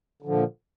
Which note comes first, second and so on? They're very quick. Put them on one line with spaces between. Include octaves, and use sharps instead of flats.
D3 F3 A#2